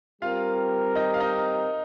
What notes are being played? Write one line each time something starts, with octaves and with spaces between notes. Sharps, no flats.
G3 C4 F4 G4 A#4 F5
D#4 D#5
F5
D#4 D#5